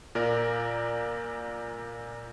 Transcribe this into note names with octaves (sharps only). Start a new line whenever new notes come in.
A#2 A#4 D5